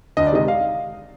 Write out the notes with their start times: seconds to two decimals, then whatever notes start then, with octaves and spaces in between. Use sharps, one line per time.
0.17 D2 D#5
0.27 D5
0.32 C3 D#3 G#3 D#5
0.48 F5